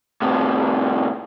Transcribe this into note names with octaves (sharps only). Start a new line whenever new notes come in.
A2 C3